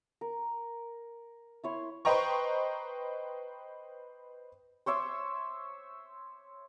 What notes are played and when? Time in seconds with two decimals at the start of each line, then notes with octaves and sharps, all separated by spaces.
0.21 A#4
1.64 E4 C#5 C6
2.05 B4 C5 D#5 G5 A#5 C#6
4.86 C5 C#5 E5 D6